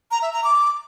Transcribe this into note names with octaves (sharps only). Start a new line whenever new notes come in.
A#5
E5
A#5
D6